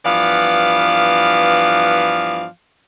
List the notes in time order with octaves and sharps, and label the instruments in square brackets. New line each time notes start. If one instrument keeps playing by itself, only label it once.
[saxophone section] G2 E3 F3 B3 D5 F5